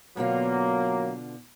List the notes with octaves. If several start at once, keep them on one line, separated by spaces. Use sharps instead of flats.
B2 D3 F#3 A#3 F4